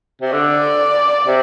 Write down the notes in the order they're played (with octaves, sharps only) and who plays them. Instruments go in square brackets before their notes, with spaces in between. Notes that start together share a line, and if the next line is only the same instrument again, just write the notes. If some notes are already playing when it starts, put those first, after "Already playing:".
[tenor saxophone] C3
[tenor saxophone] D3 [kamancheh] D5
[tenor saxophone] C3